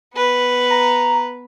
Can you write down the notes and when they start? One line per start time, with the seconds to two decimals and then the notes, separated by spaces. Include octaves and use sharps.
0.14 B3 B4
0.70 A#5